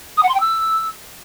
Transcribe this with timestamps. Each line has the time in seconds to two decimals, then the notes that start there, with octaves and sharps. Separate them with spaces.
0.17 D#6
0.23 F#5
0.29 C6
0.34 G5
0.40 E6